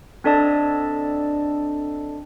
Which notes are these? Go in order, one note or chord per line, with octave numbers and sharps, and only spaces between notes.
C4 D4 A4 D5 D#5 A5